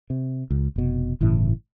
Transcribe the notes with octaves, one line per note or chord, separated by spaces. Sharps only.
C3
C#2
F1 B2
G1 A2 C#3 E3